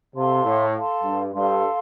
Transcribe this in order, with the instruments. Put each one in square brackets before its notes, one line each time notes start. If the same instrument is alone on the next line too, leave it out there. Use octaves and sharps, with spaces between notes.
[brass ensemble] C3 [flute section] A4 F5 A5 C6
[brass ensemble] A2
[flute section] A4 F5 A5 C6
[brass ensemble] G2
[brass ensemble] G2 [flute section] A4 F5 A5 C6